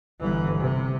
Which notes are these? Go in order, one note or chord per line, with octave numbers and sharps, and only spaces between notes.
G1 E3
C3